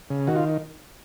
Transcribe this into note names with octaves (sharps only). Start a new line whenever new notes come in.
C#3
D#3 F#4
F4